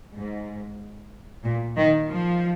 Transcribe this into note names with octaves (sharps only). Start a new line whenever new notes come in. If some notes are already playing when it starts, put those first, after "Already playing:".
G#2
A#2
D#3
F3